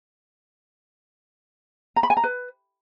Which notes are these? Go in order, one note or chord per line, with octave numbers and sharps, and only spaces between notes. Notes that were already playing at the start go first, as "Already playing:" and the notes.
A#5
B5
G#5
A#5
B4